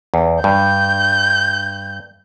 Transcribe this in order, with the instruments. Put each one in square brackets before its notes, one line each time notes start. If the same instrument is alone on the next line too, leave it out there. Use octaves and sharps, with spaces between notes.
[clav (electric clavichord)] E2
[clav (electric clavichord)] G2 [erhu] G6